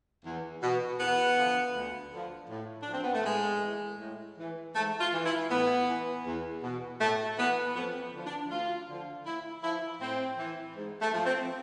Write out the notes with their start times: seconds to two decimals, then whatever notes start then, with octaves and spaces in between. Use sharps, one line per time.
0.25 E2
0.63 B2
1.00 E2 B3
1.37 D3 F3
1.76 D2
2.13 D3 F3
2.50 A2
2.82 D4
2.88 F3
2.93 C4
3.03 B3
3.14 A3
3.26 A2 G#3
3.63 E3
4.00 A2
4.38 E3
4.76 G#2 A3
5.00 F4
5.14 E3
5.26 E4
5.50 A2 B3
5.88 E3
6.26 E2
6.63 B2
7.01 A2 A3
7.38 E3 B3
7.76 F2 B3
8.14 D3 F3
8.26 D4
8.51 D2 F4
8.89 D3 F3
9.26 A2 E4
9.64 F3 E4
10.01 A2 C4
10.38 E3
10.76 G#2
11.02 A3
11.14 F3
11.26 C4